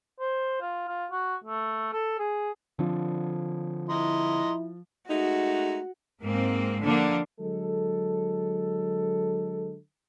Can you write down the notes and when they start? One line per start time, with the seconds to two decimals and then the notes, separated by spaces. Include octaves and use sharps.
0.20 C5
0.61 F4
0.88 F4
1.11 F#4
1.44 A3
1.93 A4
2.19 G#4
2.79 D3 F3 C4 D4
3.90 E4 D#5 A#5 C6
5.09 G#3 A3 D#4 F#4
6.22 G#2 A#3 C4
6.81 D3 F3 A#3 D4
7.41 D3 F#3 G#3 A4